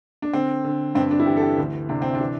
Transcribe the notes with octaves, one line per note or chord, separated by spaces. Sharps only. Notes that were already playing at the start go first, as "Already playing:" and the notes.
D4
D3 C4
D3
G2 C4
D4
E4
E3 G4
A4
G4
D2
C3 D4
C4
D4
E3